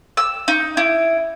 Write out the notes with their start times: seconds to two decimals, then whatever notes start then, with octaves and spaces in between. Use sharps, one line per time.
0.17 E6
0.48 D#4
0.77 E4